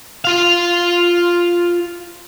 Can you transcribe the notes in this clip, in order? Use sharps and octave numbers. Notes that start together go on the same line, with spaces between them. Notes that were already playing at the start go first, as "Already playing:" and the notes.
F4 F5